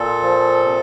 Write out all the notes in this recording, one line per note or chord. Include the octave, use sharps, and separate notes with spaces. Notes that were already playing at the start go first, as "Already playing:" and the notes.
Already playing: A#2 A4
F3
C3